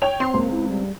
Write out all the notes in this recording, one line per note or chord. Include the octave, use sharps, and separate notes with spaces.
C#5 G5 F7
C4 C6
C#2 A#3
E4
G3